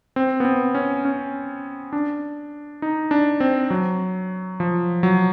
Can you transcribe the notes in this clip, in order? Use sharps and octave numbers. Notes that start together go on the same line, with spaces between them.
C4
B3
C4
C#4
C#4
D4
D#4
D4
C4
F#3
F3
F#3